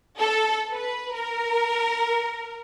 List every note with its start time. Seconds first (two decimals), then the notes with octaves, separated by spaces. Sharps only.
0.19 A4
0.71 B4
1.13 A#4